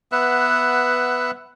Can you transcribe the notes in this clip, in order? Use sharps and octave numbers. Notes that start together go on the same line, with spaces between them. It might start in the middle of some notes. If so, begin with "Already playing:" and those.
B3 B4 E5 F#5